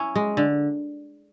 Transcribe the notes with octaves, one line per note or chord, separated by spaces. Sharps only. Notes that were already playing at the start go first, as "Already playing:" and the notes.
Already playing: C#4 E4
G#3
D3